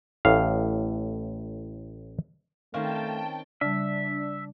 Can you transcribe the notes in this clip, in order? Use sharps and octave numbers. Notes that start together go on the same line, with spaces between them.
A1 A2 F5
D#3 A3 C4 C#4 F5 G5 A5
C#3 G3 D4 E5